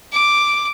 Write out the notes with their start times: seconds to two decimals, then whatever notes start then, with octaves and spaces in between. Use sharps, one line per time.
0.13 D6